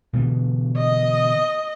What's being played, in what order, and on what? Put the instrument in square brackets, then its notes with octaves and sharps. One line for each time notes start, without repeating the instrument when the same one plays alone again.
[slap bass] B2 D3 E3
[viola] D#5